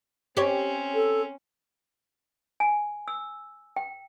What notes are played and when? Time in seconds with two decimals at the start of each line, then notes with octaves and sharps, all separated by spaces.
0.37 C4 C#4 G4 C#5
0.94 A4
2.60 G#5
3.08 E6
3.76 G5